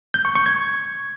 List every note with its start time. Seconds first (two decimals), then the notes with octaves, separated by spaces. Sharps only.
0.14 G6
0.25 C#6
0.35 C#6
0.46 G#6